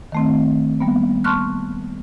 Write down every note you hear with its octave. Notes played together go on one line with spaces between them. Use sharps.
D#3 A3 C4
G3 A#3 B3
A5 C6 C#6 F6 F#6